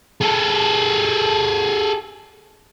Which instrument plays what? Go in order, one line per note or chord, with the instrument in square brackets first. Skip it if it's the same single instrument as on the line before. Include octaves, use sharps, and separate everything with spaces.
[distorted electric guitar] G#4 A4